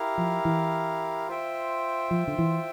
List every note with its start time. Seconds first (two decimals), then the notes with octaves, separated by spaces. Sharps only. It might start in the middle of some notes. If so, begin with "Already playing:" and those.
Already playing: E4 G4 A#4 F5
0.18 F3
0.45 E3
1.28 F4 C5 E5 G5
2.11 F3
2.27 D3
2.38 E3